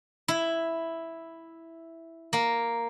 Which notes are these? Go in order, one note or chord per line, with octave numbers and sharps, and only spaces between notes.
E4
A#3